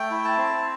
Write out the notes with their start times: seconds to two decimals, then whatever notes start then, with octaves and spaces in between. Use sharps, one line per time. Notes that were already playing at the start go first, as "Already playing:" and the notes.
Already playing: A3 G5
0.11 E4
0.25 A5
0.38 C4